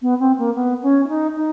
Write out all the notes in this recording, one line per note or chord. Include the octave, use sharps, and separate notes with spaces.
B3
C4
A#3
B3
C#4
E4
D#4
D#4